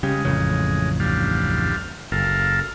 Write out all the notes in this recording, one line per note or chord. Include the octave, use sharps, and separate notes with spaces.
C#3 G3 G#3
A1 F2 C#3
D2 G3 F5
F#1 A4 A#4 F5